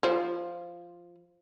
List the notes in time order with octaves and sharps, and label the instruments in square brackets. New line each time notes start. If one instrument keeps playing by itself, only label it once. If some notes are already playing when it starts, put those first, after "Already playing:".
[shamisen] F3 F4 C5